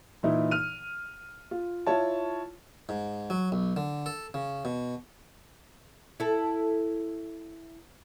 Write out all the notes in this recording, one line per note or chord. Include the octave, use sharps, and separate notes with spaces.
A#2 E3 D#4 E4
F6 D#7
F4
E4 F4 C#5 A5
G#2
F#3
B1
D3
A4
C#3
B2
E4 A4